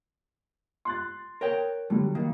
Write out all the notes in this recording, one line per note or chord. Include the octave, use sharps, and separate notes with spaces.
C6 F#6 A6
A#4 C#5 G5
D3 F#3 G3
D#3 A#3